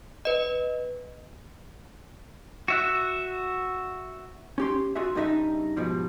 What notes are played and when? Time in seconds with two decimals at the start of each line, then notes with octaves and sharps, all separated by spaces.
0.25 B4 D#5
2.68 F#4 E5 F#6
4.58 C#4 G4 C6
4.95 F4 F#4 G#4 E5
5.15 G2 C#3 G3 D#4 B4 E5
5.76 G#2 B2 F3 G3